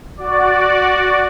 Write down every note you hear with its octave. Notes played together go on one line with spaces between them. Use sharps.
F#4 D5